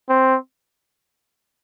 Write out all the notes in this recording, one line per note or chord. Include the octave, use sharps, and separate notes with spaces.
C4